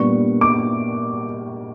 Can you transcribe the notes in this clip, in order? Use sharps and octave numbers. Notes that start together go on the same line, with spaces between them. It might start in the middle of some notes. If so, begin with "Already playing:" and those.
Already playing: A#2 G3 B3 D4 C#6
D6